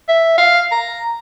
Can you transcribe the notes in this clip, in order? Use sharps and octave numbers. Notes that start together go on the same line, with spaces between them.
E5
F5
A#5